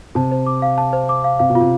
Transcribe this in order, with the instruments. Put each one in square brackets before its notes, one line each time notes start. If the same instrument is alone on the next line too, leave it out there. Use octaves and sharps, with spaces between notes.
[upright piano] C3 [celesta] A5
[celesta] C5
D6
F5
A5
C5
D6
F5
[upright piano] C3 [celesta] F5
[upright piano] B2
[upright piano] C3 [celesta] F4